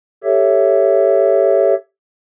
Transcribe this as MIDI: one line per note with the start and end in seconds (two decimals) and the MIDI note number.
0.24 1.74 67
0.24 1.74 69
0.24 1.74 73
0.24 1.74 76